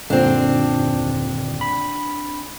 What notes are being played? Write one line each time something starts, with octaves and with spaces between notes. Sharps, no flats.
D#1 F#2 A#2 D3 C4 D4
B5